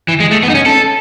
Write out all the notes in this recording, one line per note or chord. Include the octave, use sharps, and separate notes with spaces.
E3
G#3
A3
B3
D#4
C#4
A4